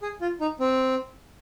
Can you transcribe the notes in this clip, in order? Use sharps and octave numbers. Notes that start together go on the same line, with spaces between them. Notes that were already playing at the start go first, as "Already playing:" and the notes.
G#4
F4
D#4
C4